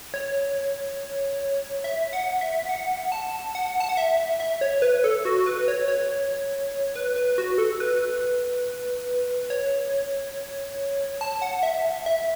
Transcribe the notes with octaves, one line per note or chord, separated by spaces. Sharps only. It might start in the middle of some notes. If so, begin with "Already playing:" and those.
C#5
E5
F#5
E5
F#5
A5
F#5
A5
F#5
E5
E5
C#5
B4
A4
F#4
B4
C#5
C#5
B4
B4
F#4
A4
B4
C#5
A5
F#5
E5
E5